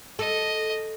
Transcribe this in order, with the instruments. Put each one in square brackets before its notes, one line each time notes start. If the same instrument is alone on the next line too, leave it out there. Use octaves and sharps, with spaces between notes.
[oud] A4 [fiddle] D#5